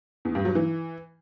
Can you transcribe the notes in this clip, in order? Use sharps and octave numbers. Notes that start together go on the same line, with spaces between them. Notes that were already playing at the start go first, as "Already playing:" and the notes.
E2
G2
F#3
E3